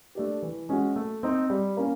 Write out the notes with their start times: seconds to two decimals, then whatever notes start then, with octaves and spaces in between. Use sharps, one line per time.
0.15 A3 D4 G4
0.42 E3
0.69 G#3 C#4 F#4
0.96 A3
1.23 C4 D#4
1.50 G3
1.77 A#3 C#4